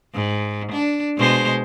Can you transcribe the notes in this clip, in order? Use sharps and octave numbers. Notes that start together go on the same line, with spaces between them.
G#2
D4
B2 G#3 C5